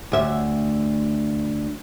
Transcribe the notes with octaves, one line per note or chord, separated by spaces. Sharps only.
D2 E5